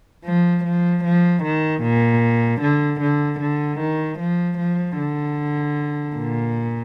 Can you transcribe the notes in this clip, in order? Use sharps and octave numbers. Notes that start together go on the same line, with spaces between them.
F3
F3
F3
D#3
A#2
D3
D3
D3
D#3
F3
F3
D3
A#2